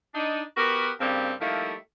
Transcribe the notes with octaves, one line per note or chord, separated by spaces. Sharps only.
D4 D#4
B3 F#4 G4 A#4
G2 C#3 G3 A#3 C4
F3 G3 A3 A#3 D#4 E4